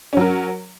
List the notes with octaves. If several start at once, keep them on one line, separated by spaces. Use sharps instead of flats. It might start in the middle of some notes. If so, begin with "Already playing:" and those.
F#3 C#4 A#4